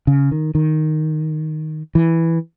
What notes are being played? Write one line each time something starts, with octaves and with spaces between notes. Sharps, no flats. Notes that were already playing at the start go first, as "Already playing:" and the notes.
C#3
D#3
D#3
E3